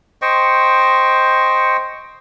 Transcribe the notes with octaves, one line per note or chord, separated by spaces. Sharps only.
C5 D#5 G5 C#6